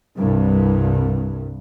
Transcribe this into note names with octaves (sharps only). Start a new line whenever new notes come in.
C2 G2